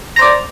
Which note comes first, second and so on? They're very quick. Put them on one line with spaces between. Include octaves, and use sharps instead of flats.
A#5 C5 D5